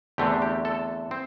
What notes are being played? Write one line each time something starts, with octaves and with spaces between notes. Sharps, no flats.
E2 D3 A3 C4 G4
G4
A4
C4